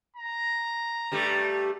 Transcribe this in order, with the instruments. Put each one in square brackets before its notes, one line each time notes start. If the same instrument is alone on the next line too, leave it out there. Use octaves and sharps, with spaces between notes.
[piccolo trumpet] A#5
[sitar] G2 G3 A3